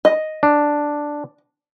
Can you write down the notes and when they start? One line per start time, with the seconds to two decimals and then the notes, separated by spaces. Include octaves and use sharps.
0.05 D#5
0.43 D4